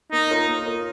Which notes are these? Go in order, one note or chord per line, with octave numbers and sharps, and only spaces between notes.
A#3 D#4
F4 A#4 C#5
A#3
F4 A#4 C#5